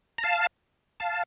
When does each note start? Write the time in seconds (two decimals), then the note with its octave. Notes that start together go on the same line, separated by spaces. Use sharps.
0.18 A#5
0.23 F5 A5
1.00 F5 A5